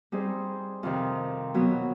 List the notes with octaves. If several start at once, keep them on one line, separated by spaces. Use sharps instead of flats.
G3 C4 D#4 G#4 C5
F2 C3 D#3
B2 F#3 B3